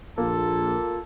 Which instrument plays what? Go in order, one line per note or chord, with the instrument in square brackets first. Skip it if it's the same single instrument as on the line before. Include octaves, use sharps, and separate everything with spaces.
[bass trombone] A#1 [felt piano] A#3 [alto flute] F4 [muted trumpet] A4